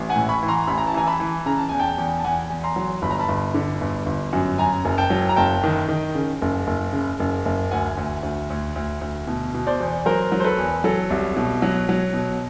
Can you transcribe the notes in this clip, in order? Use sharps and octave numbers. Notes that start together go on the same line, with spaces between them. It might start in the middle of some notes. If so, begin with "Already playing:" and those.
Already playing: A1
F#5 G#5
A2
B5 C#6
E3
A#5 C6
A1 B5
A#5
A5
E3 G#5 A#5
A5 B5
E3
C#3 A#5
A5
E2 G#5
G5 A5
E2
A5
E2 F#5 G#5
E2
A#5 C6
F#3
G1 B5
A#5
A5 B5
G1
D3
G1
G1
F#2
F#2 G#5 A#5
F#1
G5 A5
F#3
A#5
F#1 G5 A5
D#3
D#3
C#3
F#1
F#1
C#3
F#1
F#1
D2 F#5 G#5
D2
D2
D2
D2
D2
B2
B2
C5 D5
E2
F#3 A#4 C5
F#3
C5
A4 B4
E2
F#3 A4
C2
B2
F#3
F#3
B2